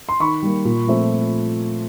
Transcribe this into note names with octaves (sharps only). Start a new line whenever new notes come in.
C6
D#3 B5 C#6
G3 A#3
A#2
F3 A3 C4